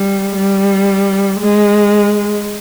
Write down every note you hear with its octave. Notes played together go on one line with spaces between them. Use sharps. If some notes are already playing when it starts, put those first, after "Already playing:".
Already playing: G3
G3
G#3